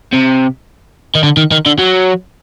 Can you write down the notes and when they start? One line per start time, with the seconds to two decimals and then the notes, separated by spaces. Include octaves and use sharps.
0.13 C3
1.15 D#3
1.23 D3
1.37 D#3
1.51 D#3
1.66 D3
1.79 F#3